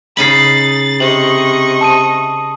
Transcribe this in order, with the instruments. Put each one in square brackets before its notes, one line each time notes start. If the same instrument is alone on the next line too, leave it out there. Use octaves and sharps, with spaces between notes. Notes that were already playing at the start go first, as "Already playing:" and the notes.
[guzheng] C#3 D#4 B5 [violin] A6 [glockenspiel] C7 F#7
[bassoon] C3 [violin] D#5 C#6 [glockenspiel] F#7
[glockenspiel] A5 D#6 D#7